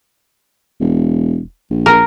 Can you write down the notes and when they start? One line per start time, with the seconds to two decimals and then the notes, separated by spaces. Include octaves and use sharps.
0.80 E1
1.70 A#1
1.86 A#4